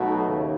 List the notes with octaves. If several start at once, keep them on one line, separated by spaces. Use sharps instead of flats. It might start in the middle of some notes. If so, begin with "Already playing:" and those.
Already playing: B1 B2 A3 D#4 F#4
D#2 C#3